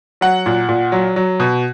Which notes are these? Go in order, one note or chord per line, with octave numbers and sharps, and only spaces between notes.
F#3 F#5
A#2
A#2
F#3
F#3
B2